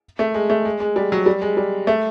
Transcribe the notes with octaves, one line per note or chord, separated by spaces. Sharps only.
A3
G#3
A3
G#3
G#3
G3
F#3
G3
G#3
G3
A3